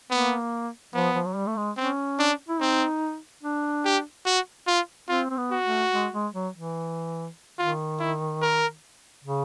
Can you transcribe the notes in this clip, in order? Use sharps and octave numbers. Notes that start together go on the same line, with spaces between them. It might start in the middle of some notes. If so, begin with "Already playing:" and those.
A#3 B3
F3 B3
F3
F#3
G3
A3
G#3
C4 C#4
D4
E4
C4 D#4
D4
G4
F#4
F4
C4 F4
C4
B3
F#4
A3
G#3
G#3
F#3
E3
D#3 F4
E4
A#4
C#3